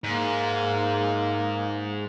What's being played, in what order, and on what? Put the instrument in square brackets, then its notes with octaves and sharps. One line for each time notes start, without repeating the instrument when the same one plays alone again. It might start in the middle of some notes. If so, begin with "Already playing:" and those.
[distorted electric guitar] G#2 [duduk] A#3